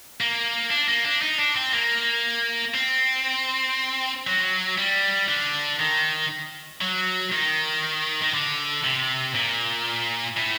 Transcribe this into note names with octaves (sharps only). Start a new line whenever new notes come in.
A#3
D4
A#3
D4
D#4
D4
C4
A#3
C4
F#3
G3
D3
D#3
F#3
D#3
D#3
D3
C3
A#2
A2